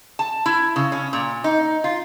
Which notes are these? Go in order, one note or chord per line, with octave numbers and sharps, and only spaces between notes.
A5
E4
C#3
C#4
A#2
D#4
F4